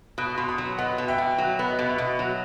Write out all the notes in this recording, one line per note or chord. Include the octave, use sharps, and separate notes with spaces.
B2 D#6 F#6
B2 C6
B5 D#6
F#3
B3 D#5 F#5
B2
E5 G5
B2
F#3
B3
D#5
B2
E5
B2 D#5
F#3